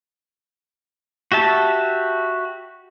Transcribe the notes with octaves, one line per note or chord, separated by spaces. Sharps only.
F#4 G4 E5 A5